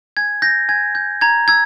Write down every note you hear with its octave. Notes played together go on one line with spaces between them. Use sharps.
G#5 G#6
G6 A#6
G#5 G#6
G6
A#5 G#6
E6 G#6